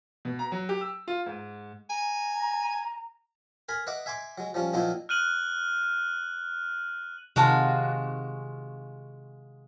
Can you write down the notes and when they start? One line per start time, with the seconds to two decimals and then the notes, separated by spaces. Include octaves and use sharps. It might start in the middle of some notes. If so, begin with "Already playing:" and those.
0.25 B2
0.39 A#5
0.52 F#3
0.69 G4
0.81 E6
1.08 F4
1.26 G#2
1.90 G#5 A#5
3.69 A#4 G#5 B5
3.87 B4 D#5 E5 F#5 D6
4.06 E5 G#5 C6 D6
4.38 F#3 G#3
4.54 F3 G3 C#4
4.73 A#2 F3 F#3 C4 D#4 E4
5.09 F6 F#6 D#7 F#7
7.36 C3 D#3 G#3 F4 F#4 G5 A5 A#5